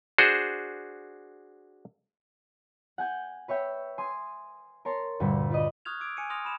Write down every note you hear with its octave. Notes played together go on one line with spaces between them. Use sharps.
D4 F#4 G#4 C5
F#5 G#5 G6
B4 C#5 E5 G5
G#5 C6 D#6
A#4 C#5 A5 C6
D2 G2 A#2
F4 B4 D5 D#5
C#6 D#6 F6 F#6 G#6 F7
D6 E6 G#6 D7
G#5 C#7 D#7
C6 D#6 F6 A#6 F7
B5 E7